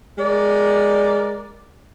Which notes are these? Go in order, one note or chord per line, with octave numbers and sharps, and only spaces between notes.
G#3 A#4 D5